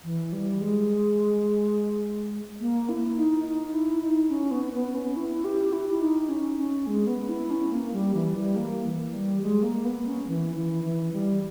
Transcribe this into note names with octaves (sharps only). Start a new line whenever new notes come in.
E3
G3
G#3
A#3
E4
D#4
D#4
E4
D#4
C#4
B3
B3
C#4
E4
G4
E4
E4
D#4
C#4
C#4
G#3
B3
E4
C#4
A#3
G3
E3
G3
A#3
E3
G3
G#3
A#3
B3
C#4
E3
E3
E3
G3